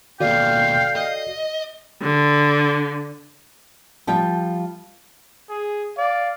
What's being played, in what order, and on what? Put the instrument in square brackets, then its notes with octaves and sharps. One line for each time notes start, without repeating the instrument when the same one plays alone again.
[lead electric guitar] D#2 B2 [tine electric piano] F#4 A4 D5 [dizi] F5 [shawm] G5
[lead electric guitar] D#5
[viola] D3
[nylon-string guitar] F3 G3 F4 G5
[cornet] G#4
[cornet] D5 [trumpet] F5